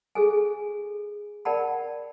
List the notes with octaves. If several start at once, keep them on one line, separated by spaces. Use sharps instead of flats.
G#4 A4 G#5
A#4 D5 F#5 G5 A5 B5